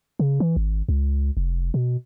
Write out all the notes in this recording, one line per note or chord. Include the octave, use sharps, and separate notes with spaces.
C#3
E3
G#1
C#2
F1
B2